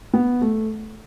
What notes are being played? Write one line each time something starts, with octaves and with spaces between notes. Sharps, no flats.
B3
A3